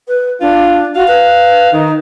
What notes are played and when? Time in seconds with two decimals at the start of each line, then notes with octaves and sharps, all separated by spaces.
0.08 B4
0.41 D4 F4
0.95 F#4 F5
1.08 B4
1.72 D#3 D#4